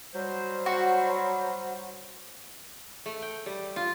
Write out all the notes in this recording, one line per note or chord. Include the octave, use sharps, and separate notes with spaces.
F#3 G3 C5
F#4
A3
G5
G3
F4